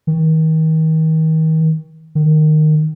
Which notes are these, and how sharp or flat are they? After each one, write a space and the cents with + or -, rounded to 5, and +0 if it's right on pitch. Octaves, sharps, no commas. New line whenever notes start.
D#3 +35
D#3 -15